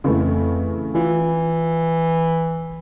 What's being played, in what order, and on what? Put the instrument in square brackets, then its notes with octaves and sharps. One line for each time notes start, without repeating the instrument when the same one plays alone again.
[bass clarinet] F2 [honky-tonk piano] C#3 E3 A3
[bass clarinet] E3 [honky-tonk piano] F4